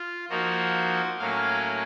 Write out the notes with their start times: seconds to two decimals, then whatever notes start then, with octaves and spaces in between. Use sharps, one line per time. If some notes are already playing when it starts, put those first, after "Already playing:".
Already playing: F4
0.30 F3 A#3 D#4 F#4
1.19 A2 F#3 A#3 C#4 F5